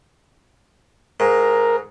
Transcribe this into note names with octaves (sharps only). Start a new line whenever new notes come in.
G#2 A#4